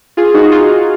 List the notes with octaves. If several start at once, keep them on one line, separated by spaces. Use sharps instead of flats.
F4 G#4
D#4 F#4
F4 G#4